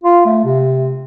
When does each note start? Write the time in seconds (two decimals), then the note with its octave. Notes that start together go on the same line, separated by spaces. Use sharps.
0.04 F4
0.26 A3
0.45 C3